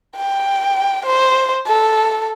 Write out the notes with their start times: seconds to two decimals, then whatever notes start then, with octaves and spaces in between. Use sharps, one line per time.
0.16 G5
1.06 C5
1.67 A4